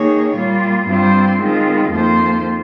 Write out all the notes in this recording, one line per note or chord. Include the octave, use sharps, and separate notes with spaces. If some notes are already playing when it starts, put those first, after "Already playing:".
Already playing: D#3 A#3 D#4 G#4 C#5
A#2 G3 A#3 F4
G2 G3 C4 F4 C5
D#3 G#3 C4 F4
F2 D#3 A#3 F4 C5